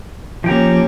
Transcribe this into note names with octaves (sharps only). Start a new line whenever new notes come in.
F3 A#3 C#4 G4 G5 A#5